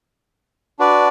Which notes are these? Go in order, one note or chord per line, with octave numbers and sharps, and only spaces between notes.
D4 F#4 B4 D5